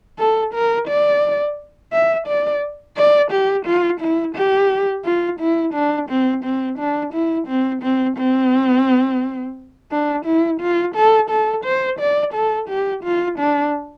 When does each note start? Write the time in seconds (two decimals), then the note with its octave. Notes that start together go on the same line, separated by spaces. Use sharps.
0.19 A4
0.54 A#4
0.88 D5
1.93 E5
2.27 D5
2.97 D5
3.31 G4
3.66 F4
4.01 E4
4.36 G4
5.05 F4
5.40 E4
5.74 D4
6.09 C4
6.44 C4
6.79 D4
7.13 E4
7.48 C4
7.82 C4
8.17 C4
9.91 D4
10.26 E4
10.61 F4
10.96 A4
11.30 A4
11.65 C5
12.00 D5
12.34 A4
12.69 G4
13.04 F4
13.39 D4